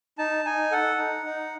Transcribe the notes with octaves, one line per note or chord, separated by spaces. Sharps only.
D#4 A5
D#4 G#5
A4 F#5
D#4
D#4